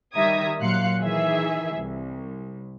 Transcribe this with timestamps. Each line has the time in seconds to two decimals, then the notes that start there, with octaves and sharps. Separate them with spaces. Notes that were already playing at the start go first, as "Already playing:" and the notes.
0.14 D#3 G3 E5 A#5 D#6 G#6
0.60 A#2 F#3 F5 C6 F#6 C#7
1.00 D#3 E3 G#4 E5
1.77 C2